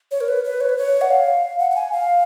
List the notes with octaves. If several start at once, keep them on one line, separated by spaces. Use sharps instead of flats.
C#5
A#4
B4
B4
C#5
B4
C#5
F#5
F5
F#5
F#5
G#5
F5